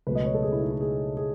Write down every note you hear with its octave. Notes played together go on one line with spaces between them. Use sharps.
C#2 B2 F#3 A3 B4
D#5
C#5
A4
G#4
E4
D#4
E4
G#4
G#4